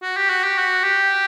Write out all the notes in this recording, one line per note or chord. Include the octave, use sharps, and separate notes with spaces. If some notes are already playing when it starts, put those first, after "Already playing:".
F#4
G4
F#4
G4
F#4
G4